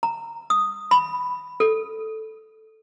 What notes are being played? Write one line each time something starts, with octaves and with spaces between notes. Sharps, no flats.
A#5
D#6
B5
A4